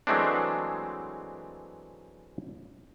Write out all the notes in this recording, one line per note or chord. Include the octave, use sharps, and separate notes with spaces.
E3 F#3 G#3 A3 C4 D4